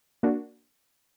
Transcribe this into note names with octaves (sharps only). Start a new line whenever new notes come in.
A#3 D4 F#4